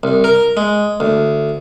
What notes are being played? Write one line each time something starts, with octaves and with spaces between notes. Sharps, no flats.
C2
A#4
G#3
D2